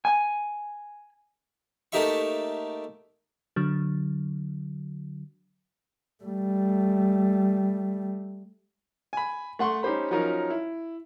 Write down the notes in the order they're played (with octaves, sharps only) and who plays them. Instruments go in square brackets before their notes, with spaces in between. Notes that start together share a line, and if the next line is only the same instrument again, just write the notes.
[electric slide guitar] G#5
[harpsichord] A3 A#3 D#4 G4 E5 C#6
[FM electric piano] D3 F#3
[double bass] G3 A3
[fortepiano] G#5 B5
A3 F#5 C6 C#6
C#4 D#4 G4 C5 B5
F3 F#3 C#4 D#4 A#4
E4